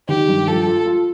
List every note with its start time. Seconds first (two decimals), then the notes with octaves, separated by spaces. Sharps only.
0.09 D#3 G4
0.28 G2
0.47 F3 A4
0.66 F4
0.86 F4